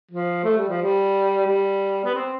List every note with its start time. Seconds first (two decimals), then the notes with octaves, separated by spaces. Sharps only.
0.11 F3
0.44 A3
0.57 G3
0.69 F3
0.82 G3
1.46 G3
2.05 B3
2.14 C4